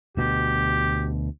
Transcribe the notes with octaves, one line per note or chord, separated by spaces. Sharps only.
D2 B2 G4